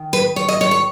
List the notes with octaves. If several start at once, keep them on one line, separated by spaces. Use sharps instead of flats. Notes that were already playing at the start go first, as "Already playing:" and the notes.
Already playing: D#3
B4
C#5
D#5
C#5
C#5